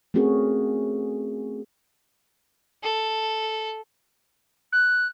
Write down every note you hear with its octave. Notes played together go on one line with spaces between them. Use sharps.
A3 C4 C#4 F#4 G#4 A#4
A4
F#6